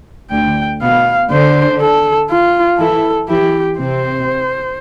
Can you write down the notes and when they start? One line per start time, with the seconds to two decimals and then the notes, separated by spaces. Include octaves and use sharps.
0.31 D2 D3 G5
0.81 B2 B3 F5
1.31 D3 D4 C5
1.81 A4
2.30 F4
2.79 E3 E4 A4
3.28 E3 E4 G4
3.78 C3 C4 C5